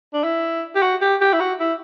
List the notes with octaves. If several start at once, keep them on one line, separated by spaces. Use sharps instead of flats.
D4
E4
G4
F#4
G4
G4
E4
F#4
E4